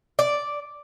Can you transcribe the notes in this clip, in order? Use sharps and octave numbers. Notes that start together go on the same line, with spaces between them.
D5